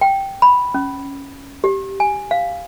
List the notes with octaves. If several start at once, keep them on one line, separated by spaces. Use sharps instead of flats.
G5
B5
C#4
G4
G#5
F5